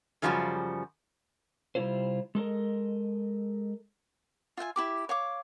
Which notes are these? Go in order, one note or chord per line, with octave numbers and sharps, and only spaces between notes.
F#2 C#3 F3 G3 F#4 G4
C3 G3 G#3 E4 F4 C5
G#3 A4 A#4 D#5
F4 E5 G5 G#5
E4 G4 D6
C#5 F5 D6